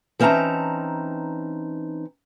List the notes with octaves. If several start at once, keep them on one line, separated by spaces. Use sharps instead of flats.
E3 C4 C#4 D#4 A5 A#5